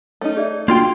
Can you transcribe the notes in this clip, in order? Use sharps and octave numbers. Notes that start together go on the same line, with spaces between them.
A3 C#4 D#4
G#4 D5 E5
A#3 D4 F4 F#4 G5 C6